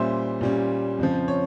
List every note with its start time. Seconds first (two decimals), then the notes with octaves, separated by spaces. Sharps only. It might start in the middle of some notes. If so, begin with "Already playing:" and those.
Already playing: A#2 G3 C#4 C5 E5
0.41 A#2 G3 C#4
0.99 F2 C#3 F3
1.28 C#5